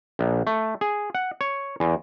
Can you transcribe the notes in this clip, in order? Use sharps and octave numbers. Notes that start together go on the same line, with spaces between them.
A#1
A3
G#4
F#5
C#5
E2